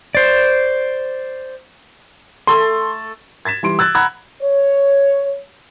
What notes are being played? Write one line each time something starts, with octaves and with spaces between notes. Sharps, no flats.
C5 D5
A3 A4 C6
G#6 A6 B6 E7
E3 G3 C6 D7
E6 F#6 G#6 A6
F#5 A#5 B5 E6 F#6 G#6
C#5